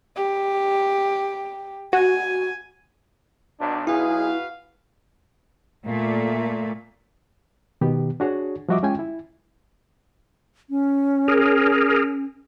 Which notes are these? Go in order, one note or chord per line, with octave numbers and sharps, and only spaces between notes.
G4
F#4 G#5
B1 D4
B1 E4 F#4 G#4 B4 F5
A#2 A3
B2 D#3 B3 G4
D4 F#4 G#4 C#5
F3 G3 F#4 D#5 E5 D6
G#3 C#4 F4 G5 G#5
E4
C#4
G#4 A#4